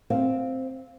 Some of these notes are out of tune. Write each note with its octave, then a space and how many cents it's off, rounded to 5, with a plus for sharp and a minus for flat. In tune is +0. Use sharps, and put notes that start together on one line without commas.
C4 +0 F5 +0